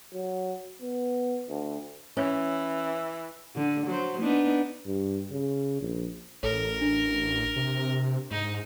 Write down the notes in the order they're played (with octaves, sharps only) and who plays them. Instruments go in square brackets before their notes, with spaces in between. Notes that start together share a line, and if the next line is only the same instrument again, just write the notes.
[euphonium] F#3
B3
D2
[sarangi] E3 [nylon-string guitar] C#4
[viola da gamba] D3
F#3 C5
B3 D4 D#4
[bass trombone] G2
C#3
A#1
[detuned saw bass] A1 [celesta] A4 C#5 [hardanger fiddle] A#4
[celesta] D4
[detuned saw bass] C3
[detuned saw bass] G#2 [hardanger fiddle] D#4